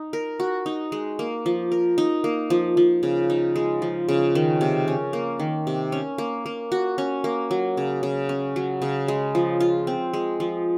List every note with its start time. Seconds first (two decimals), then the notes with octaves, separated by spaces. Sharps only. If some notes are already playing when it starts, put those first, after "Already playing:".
Already playing: D#4
0.13 A#4
0.40 F#4
0.66 D#4
0.92 G#3
1.19 A#3
1.46 F3
1.72 A#4
1.98 D#4
2.24 A#3
2.50 F3
2.77 F3
3.03 C#3
3.30 D#4
3.56 G#3
3.82 F3
4.09 C#3
4.35 D#3
4.61 C3
4.88 C#4
5.13 A#3
5.39 D#3
5.67 C3
5.92 C#4
6.18 A#3
6.46 A#3
6.72 F#4
6.98 C#4
7.24 A#3
7.51 F#3
7.77 C#3
8.03 C#3
8.29 C#4
8.56 F#3
8.82 C#3
9.08 G#3
9.35 F3
9.60 F4
9.87 C4
10.13 G#3
10.40 F3